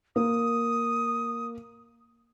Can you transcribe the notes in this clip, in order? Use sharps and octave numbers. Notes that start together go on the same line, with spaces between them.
A#3 D#6